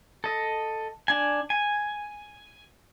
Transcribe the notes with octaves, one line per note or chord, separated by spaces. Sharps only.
A4 D#5
D4 G#5
G#5